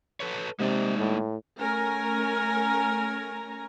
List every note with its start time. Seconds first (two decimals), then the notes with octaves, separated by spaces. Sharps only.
0.20 A4 B4 C#5
0.60 C3 G#3 A#3 D#4 D5
0.98 A2
1.59 A3 C#4 A#4 G#5 A#5